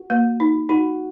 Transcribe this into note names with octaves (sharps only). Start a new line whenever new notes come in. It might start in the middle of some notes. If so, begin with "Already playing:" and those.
Already playing: F#4
A#3
D#4
D#4 F#4